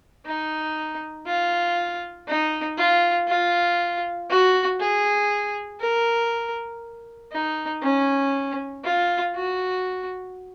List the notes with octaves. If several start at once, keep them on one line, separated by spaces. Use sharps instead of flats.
D#4
F4
D#4
F4
F4
F#4
G#4
A#4
D#4
C#4
F4
F#4